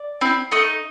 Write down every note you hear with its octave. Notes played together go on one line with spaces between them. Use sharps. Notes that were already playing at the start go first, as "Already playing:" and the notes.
Already playing: D5
C4 E4
A3 D#4 D#5